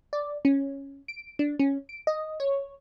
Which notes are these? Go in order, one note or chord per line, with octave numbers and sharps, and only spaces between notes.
D5
C#4
D7
D4
C#4
D7
D#5
C#5